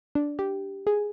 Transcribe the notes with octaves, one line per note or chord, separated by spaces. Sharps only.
D4
G4
G#4